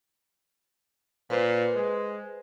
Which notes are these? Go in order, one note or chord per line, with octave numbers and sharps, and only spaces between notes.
A#2 B4 C5
G#3